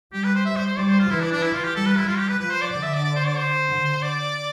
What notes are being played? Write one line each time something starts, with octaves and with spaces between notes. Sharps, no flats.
G3 G4
B4
C5
E5
C5
C5
G3 D5
C5
F4
E3 E4
D4
D4
E4
F4
G4
G3 A4
B4
E4
G3 F4
G4
B4
F3 B4
C5
D5
D3 D5
E5
D5
D5
C5
D5
C5
D3
D5